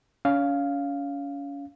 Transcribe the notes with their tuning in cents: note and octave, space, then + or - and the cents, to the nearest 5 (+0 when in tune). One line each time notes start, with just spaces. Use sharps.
C#4 +35 F5 +0